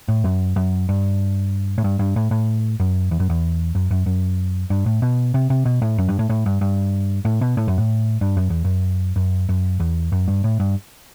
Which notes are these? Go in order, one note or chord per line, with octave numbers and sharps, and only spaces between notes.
A2
F#2
F#2
G2
A2
G2
G2
A2
A2
F#2
E2
F#2
E2
F#2
F#2
F#2
G2
A2
B2
C3
C3
B2
A2
F#2
G2
A2
A2
G2
G2
A2
B2
A2
F#2
A2
G2
F#2
E2
F#2
F#2
F#2
E2
F#2
G2
A2
G2